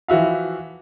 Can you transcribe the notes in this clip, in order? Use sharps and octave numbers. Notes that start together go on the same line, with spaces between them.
E3 F3 F#4 E5 F5